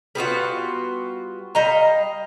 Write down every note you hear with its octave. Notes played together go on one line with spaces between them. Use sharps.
G3 B3 F4 F#4
G3 D#5 F5 A#5